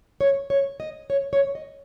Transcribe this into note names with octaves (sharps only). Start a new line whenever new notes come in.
C#5
C#5
D#5
C#5
C#5
D#5